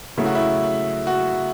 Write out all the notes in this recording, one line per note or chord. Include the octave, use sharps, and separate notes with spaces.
C#3 F#3 A3 E4
F#4
E4
F#4